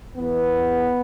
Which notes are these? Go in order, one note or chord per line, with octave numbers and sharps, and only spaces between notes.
E2 E3 B3